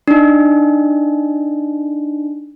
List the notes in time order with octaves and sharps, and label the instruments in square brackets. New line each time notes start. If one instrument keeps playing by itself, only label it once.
[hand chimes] D4 D#4